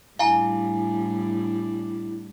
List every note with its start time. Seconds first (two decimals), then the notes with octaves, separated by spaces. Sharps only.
0.19 A2 G3 D4 E4 F5 G#5 A#5